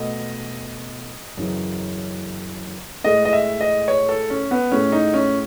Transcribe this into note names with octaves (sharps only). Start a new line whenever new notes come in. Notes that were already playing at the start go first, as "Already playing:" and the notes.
Already playing: B2 A3 D#5
F#2 C#3 E3
A2 G#3 D#5
D#5
E5
D#5
C#5
A4
C#4
B3
A2 G#3 C#4
D#4
C#4